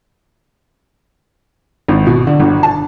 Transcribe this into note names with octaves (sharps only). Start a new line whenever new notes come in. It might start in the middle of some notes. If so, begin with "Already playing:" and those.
G#1
B2
D3
G1
A5